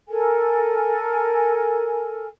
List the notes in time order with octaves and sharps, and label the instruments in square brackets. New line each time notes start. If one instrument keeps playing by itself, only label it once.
[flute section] A4 A#4 G#5